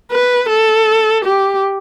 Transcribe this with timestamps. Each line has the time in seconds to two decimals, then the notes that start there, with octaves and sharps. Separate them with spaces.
0.12 B4
0.50 A4
1.25 G4